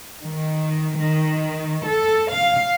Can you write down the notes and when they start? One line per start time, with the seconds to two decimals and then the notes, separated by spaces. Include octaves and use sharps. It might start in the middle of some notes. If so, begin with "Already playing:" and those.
0.21 D#3
0.98 D#3
1.86 A4
2.32 F5